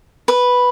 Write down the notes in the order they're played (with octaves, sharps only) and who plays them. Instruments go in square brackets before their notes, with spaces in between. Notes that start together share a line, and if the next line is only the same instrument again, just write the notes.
[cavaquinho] B4